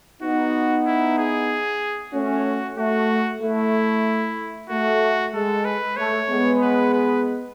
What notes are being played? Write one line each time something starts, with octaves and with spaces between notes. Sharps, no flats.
B3 D#4 F#4
E4
G#4
A3 C#4 F#4
A3 F#4
A3 E4
A3 F#4
G#3 A4
B4
A3 C#5
G#3 B3
B4
B4